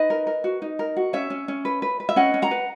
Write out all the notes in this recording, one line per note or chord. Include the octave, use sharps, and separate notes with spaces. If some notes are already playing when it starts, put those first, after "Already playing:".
Already playing: D#4 B4 D#5
A#4
A#4
F#4
D#4
A#4
F#4
C#4 C#5 E5
C#4
C#4
B4
B4
B4
E5
C#4 D#5 F#5
C#4
F#5 A#5
B4